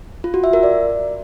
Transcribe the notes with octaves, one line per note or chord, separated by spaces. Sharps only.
F4
F#4
E5
A#4
D5